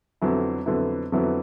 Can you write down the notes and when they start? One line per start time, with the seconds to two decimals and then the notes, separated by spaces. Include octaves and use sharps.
0.22 F2 D3 F#3 B3 E4
0.66 F2 D3 F#3 B3 E4
1.12 F2 D3 F#3 B3 E4